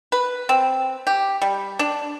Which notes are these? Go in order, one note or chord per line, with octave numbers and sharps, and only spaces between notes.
B4
C4
G4
G3
D4